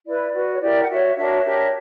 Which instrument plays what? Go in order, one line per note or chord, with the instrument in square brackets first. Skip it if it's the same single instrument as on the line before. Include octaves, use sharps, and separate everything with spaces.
[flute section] E4 B4 D5
F#4 B4
C#5
E4 G4 A#4 D5
F#5
F#4 C#5 E5
D4 F#4 A#4 C#5 E5
D4 G4 A#4 C#5